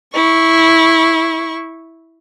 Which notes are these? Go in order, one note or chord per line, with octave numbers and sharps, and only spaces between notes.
E4 C#6